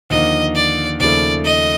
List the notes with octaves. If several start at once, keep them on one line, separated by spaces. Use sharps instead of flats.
D#2 D3 F3 A#3 D#5
D5
D#2 C#3 F3 A3 D5
D#5